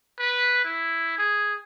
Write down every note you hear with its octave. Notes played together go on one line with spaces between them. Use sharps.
B4
E4
G#4